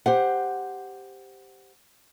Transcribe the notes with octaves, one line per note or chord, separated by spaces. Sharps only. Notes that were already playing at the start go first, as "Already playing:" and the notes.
G4 C5 F#5